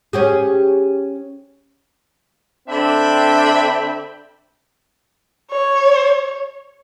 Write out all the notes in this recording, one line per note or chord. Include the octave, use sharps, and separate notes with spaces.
C#4 G4 G#4
D3 C4 D4 E5 G5 B5
C#5